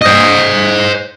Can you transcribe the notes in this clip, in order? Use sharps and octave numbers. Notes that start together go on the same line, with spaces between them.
C5 D#5